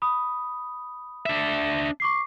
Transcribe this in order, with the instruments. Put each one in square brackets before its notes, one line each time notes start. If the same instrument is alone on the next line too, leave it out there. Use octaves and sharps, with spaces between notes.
[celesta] B5 D#6
[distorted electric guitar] D4 E5
[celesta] C#6 D6 C7